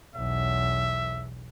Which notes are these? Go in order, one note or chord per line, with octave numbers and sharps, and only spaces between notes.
B1 E2 E5